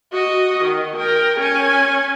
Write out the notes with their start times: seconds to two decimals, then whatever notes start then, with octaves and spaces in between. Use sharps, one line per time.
0.12 F#4 D#5
0.63 D#3
0.96 A#4 G5
1.39 C#4 G#5